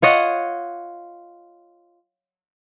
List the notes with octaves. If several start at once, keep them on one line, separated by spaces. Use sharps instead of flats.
F4 C#5 D#5 F#5